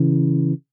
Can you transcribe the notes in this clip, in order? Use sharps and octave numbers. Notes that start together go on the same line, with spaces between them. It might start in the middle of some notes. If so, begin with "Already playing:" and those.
Already playing: C#3 E3